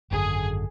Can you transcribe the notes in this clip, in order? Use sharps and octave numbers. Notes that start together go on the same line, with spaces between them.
G#1 F#2 D3 G#4